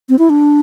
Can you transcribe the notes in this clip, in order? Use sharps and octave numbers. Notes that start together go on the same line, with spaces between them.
C4
E4
D4